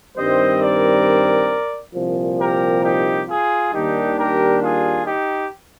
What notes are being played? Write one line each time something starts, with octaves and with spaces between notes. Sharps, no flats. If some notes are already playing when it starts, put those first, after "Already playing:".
G2 D#3 G3 C4 C5 D#5
A#4 D5
C2 A#2 F3
G4 A#4
D#4 G4
F4 G#4
D#2 D#3 G3 D4 D#4 G4
G4 A#4
F4 G#4
D#4 G4